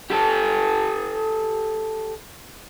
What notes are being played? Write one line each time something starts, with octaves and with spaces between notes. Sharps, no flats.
G4 A4